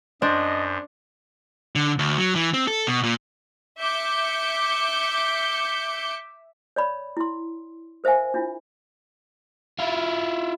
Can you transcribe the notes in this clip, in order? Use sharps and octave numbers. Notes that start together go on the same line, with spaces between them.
F#2 D4 C5 D#5
D3
D2
F#3
E3
C4
A4
B2
A#2
E5 D6 G6 C#7
C#5 D5 B5
E4 C6
A#4 C5 E5 F5 G#5
D4 E4 F4
E4 F4